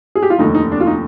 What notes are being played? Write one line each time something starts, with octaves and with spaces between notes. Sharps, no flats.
G#4
G4
F4
F1 D#2 D3 D#4
D#4
D4
F4
D#4